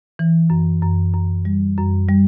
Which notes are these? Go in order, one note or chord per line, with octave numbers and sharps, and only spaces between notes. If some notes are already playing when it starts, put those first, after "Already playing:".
E3
F#2
F#2
F#2
G3
F#2
G3